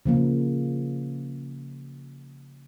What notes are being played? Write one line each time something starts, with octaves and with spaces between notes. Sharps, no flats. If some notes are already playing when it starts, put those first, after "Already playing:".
C#3 F3 A#3